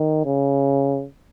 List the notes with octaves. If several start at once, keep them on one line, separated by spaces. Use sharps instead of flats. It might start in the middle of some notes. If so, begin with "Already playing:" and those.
Already playing: D#3
C#3